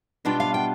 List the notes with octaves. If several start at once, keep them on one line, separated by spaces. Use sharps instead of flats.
B2 G3 B3 D4 F4 G5
F5
G5